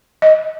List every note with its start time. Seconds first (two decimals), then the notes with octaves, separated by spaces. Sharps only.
0.22 D#5